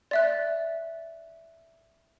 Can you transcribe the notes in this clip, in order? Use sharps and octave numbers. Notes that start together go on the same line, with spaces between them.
D5 E5 F#6